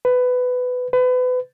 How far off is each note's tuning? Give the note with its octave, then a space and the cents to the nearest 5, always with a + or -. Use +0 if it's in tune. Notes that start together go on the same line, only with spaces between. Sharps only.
B4 +15
B4 +30